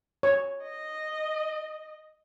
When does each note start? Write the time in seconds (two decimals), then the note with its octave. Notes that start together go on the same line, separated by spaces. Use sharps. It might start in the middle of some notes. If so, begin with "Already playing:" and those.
0.23 C#5
0.62 D#5